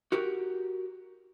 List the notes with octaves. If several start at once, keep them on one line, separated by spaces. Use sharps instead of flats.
F#4 G4 A#4